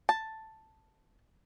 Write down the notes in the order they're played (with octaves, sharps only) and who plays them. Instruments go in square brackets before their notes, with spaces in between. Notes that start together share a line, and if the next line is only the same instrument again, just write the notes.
[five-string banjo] A5